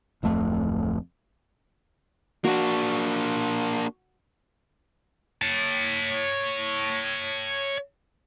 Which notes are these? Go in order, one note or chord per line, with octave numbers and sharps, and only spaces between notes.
D1 F2 A3
A#3 D4 F#4
C#5 A5